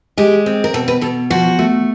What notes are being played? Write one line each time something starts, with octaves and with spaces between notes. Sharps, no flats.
G#3 G4
C4
A#4
B2 A4
B4
B2 A4
F3 F#4
A3